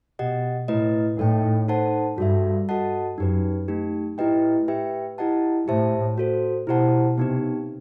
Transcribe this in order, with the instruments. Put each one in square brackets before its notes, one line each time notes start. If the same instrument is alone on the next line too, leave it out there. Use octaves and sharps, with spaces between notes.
[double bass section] B2 [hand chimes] G4 D#5 F#5
[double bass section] A2 [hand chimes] A3 E4 B4 D#5
[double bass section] A2 [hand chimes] D#4 A4 D#5 G5
[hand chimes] D#4 A4 C5 F#5 A5
[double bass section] G2 [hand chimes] F#4 A4 E5
[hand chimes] F#4 A4 D#5 F#5 A5
[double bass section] F#2 [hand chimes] D#4 G4 B4
[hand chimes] A3 D#4 G4
[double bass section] A2 [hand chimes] E4 G4 B4 D#5 G5
[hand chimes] G4 B4 E5 G5
E4 G4 D#5 F#5 A5
[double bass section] A2 [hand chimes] G4 C5 E5 A5
[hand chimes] F#4 A4 C5
[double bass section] B2 [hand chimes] E4 G4 C5 F#5 A5
[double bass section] C3 [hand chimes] B3 D#4 G4